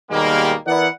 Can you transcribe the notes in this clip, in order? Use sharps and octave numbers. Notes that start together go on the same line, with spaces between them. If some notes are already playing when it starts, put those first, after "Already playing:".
D#2 B2 D#3 G3 G#3 A#3
E3 B3 E4 A#4 D5 F#5